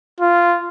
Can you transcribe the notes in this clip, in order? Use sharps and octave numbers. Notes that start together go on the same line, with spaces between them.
F4